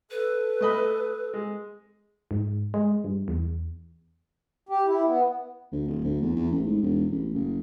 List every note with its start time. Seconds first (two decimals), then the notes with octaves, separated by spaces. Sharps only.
0.11 A4 B4
0.61 A3 D#5 B5
1.34 G#3
2.31 G#2
2.74 G#3
3.04 G2
3.28 E2
4.69 G4
4.86 E4
5.06 B3
5.72 D2
5.87 D1
6.04 D2
6.21 E2
6.36 E2
6.51 A1
6.66 G#2
6.81 E1
7.11 A1
7.33 F#1